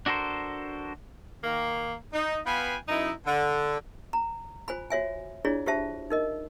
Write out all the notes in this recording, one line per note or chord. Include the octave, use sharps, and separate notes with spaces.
D4 F#4 A4 A#4 C5
D#3 A#3
D#4
B3 F4 B4 F5 G5 G#5
F#2 D#4 E4
D3
A#5
F4 C5 G#5 B5
F#4 C#5 E5 G#5
D4 E4 F4 G#4 C#5 D5
F4 G4 C5 E5 A5
D#4 A#4 D#5